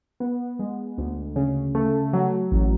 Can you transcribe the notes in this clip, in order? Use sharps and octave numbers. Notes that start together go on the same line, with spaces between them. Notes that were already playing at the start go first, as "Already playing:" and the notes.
B3
G#3
D2
C#3
A3
F#3
A1